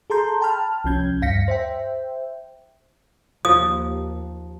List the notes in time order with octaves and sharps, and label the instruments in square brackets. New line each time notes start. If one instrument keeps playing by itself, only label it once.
[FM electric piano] G#4 A4 A5 A#5 C6 G6
G5 A5 B5 F6
C2 F3 C#4 G6 G#6
D2 G2 F5 A#6 B6 C#7
C5 E5 G5
[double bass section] D#2 [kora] F3 [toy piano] D#6